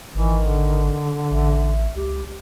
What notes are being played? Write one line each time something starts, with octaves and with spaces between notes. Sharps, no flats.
G#1 D#3 E3
D3
A1 E5
C#2 G4